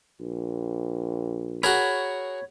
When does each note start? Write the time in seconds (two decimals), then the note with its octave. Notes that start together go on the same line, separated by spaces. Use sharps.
0.20 A#1
1.63 F#4 G#4 A#4 C#5 B5